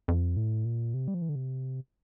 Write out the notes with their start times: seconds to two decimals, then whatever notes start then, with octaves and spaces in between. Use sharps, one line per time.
0.08 F2
0.37 A2
0.65 A#2
0.94 C3
1.08 G3
1.14 F3
1.22 E3
1.29 D3
1.35 C3